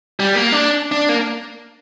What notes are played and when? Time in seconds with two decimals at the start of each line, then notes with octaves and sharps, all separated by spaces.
0.20 G3
0.35 A#3
0.52 D4
0.92 D4
1.09 A#3